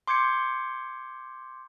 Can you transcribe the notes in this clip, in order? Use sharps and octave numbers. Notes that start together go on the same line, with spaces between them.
C6 D6 G6 G#6 C#7